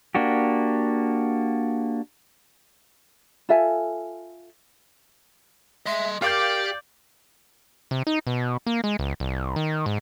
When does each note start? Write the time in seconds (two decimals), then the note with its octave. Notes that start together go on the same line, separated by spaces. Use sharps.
0.15 A#3 D4 F#4 G4
3.49 F4 A4 E5 G#5
5.86 D#5 E5 C6
6.22 G4 A#4 D5 F5 D6 G6
7.91 C3
8.07 D#4
8.27 B2
8.66 A#3
8.84 G#3
8.99 C#2
9.20 C2
9.56 D#3
9.86 G#2